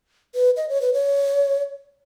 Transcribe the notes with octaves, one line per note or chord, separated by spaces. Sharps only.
B4
D#5
C#5
B4
C#5